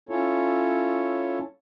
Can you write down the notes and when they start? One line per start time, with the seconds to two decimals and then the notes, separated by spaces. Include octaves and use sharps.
0.09 C#4 E4 F4 A4 C#5